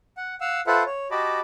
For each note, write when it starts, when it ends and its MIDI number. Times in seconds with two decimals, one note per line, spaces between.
0.17 0.35 78
0.41 0.61 77
0.41 0.61 78
0.41 0.61 88
0.67 0.83 65
0.67 0.83 69
0.67 0.83 71
0.67 0.83 72
0.67 0.83 76
0.67 0.83 78
0.86 1.08 73
1.11 1.40 66
1.11 1.40 67
1.11 1.40 75
1.11 1.40 81
1.11 1.40 83
1.11 1.40 86